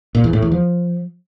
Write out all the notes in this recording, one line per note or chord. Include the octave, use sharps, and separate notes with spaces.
A#2
E2
A2
E2
F3